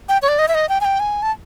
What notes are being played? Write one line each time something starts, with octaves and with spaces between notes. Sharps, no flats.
G5
C#5
D5
D#5
E5
D#5
G5
G#5
G5
G#5
A5